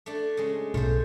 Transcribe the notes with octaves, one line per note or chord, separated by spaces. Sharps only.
A3 D4
C#3 G#3
B1 A3 F4 C5